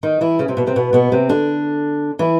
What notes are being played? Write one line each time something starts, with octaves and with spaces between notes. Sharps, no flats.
D#3 D#4
E3 E4
C#3 C#4
C3 C4
B2 B3
C3 C4
B2 B3
B2 B3
C3 C4
D3 D4
E3 E4